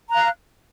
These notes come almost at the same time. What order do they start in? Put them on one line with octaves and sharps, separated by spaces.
A#5 F#6 F5